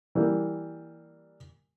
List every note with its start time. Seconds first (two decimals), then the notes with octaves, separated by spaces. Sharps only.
0.15 E3 G3 A#3